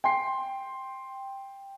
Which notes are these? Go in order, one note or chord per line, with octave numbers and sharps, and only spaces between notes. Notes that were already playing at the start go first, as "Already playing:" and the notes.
G5 C6 C7